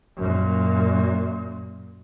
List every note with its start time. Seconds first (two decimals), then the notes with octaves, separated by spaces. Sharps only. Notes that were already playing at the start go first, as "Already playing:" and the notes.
0.17 F#2 A#2